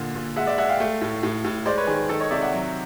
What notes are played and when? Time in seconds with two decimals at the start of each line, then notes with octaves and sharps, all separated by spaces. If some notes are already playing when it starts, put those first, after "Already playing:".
Already playing: A#2 D3
0.15 A#2
0.36 G#3 E5 F#5
0.47 D5 E5
0.58 G#3 E5 F#5
0.69 F5 G5
0.80 A3
1.01 A2
1.23 A2
1.44 A2
1.66 G#3 C5 D5
1.78 B4 C#5
1.87 D#3 G#4
2.09 D#3 A4
2.20 C#5 D#5
2.31 C3 D5 E5
2.42 E5 F#5
2.53 F#3